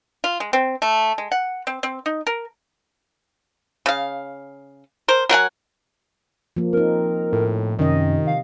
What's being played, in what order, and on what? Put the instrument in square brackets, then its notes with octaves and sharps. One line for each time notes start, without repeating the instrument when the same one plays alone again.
[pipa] F4
G#3
C4
A3
G#3
F#5
C4
C4
D#4
A#4
C#3 F5
A#4 C5
F#3 A#4 F#5 G#5
[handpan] F3 A#3
[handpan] C4 D#4 [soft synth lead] A#4
[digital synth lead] A2
[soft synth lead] F#2 [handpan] C3 D#5 [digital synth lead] D#3
[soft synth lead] F5